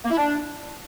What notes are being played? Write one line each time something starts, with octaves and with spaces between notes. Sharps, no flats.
A#3
E4
D4